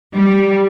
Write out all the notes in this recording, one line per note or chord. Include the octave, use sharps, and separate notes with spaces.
G3